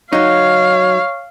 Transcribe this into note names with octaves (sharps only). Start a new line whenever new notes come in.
F#3 D#4 C#5 F5